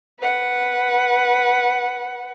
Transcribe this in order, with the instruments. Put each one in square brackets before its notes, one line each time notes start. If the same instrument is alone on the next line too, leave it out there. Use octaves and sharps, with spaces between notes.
[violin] B4 F#5